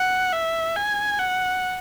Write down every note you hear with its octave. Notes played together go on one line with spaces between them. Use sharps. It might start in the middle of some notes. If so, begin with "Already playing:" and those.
Already playing: F#5
E5
G#5
F#5